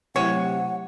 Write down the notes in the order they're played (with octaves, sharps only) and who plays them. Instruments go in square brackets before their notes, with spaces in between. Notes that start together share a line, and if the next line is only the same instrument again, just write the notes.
[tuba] C3 [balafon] F#3 A3 E4 [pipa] C#5 [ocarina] F#5